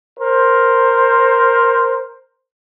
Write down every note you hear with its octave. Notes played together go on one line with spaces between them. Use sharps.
A#4 C5